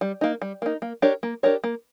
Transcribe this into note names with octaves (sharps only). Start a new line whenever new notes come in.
G3
A#3 D#4
G3
A#3 D#4
A#3
D4 G4 A#4 C#5
A#3
D4 G4 A#4 C#5
A#3